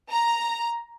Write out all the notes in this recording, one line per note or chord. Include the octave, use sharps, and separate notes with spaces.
A#5